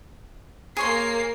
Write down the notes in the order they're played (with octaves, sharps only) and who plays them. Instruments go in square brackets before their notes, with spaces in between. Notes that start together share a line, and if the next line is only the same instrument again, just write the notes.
[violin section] A#3 C7 [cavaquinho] G#4 C#5 C6